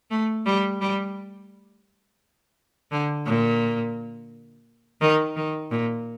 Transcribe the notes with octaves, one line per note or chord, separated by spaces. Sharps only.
A3
G3
G3
D3
A#2
D#3
D#3
A#2